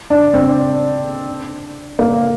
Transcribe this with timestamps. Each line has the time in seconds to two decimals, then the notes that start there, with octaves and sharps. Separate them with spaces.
0.10 D4
0.34 C4
1.99 A#3